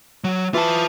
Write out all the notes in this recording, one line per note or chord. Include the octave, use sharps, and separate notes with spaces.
F#3
E3 F4 A5